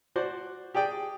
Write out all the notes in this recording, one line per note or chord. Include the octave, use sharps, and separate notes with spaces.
F#4 C5 D5
G4 G#4 D5 G5